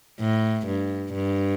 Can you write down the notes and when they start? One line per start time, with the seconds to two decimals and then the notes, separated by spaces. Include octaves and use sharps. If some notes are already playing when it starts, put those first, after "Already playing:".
0.20 A2
0.67 G2
1.13 G2